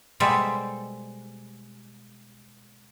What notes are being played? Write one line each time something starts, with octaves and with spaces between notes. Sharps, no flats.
B2 G3 G#3 A4 C5 E5